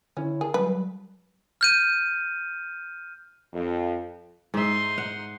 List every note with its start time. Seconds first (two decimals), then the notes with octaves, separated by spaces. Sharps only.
0.17 D3 C#4 E4 C#5
0.41 G#4 A#4 A5
0.54 F#3 G3 B4
1.61 F6 G6 D#7
3.53 F2
4.54 G#2 D#4 E5 C6
4.98 F#5